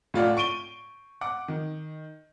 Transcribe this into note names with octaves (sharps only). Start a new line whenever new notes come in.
A2 F4 D5 F#5
C#6 D7 D#7 G7
F#5 D6
D#3